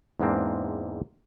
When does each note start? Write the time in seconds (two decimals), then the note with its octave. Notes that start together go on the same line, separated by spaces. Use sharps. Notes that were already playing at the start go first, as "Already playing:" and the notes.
0.20 E2 G#2 G#3 A#3 C4 D4